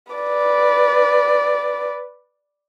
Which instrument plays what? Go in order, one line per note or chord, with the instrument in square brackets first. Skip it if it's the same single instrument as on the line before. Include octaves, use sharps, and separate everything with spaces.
[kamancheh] B4 D5